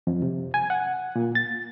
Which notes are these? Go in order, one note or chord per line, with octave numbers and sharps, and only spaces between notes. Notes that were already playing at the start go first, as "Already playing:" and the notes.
F2
C3
G#5
F#5
A#2
A6